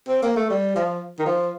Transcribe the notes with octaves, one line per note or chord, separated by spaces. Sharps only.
C4
A#3
A3
G3
F3
D#3
F3